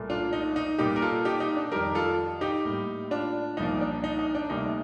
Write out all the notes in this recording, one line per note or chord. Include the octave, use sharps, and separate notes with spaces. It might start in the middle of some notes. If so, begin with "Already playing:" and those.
Already playing: C2 A#2 A3
D4 F4
D#4
D#4
A#2 G3 A#3 D#4 G4
A#4
F4 A4
D#4 G4
D#4
D4
F2 D#3 G3 G4 A#4
F4 A4
D#4 G4
A2 G3 A#3
D4 F4
C2 A#2 F3 A#3 D#4
D4
D#4
D#4
D4
D2 C3 G3 A#3 D#4